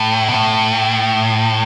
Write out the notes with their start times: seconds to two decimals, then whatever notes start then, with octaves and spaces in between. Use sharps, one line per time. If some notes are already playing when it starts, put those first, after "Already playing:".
Already playing: A2
0.29 B2
0.32 A2